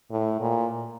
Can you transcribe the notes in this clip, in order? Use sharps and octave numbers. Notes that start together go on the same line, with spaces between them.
A2
A#2